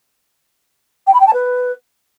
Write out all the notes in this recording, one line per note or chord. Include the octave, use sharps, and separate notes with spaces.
G5
B5
G5
A5
B4